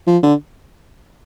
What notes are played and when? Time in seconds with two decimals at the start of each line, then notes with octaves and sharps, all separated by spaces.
0.07 F3
0.23 D3